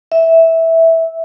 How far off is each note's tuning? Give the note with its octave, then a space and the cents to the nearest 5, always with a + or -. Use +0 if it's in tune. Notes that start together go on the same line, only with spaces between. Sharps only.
E5 -10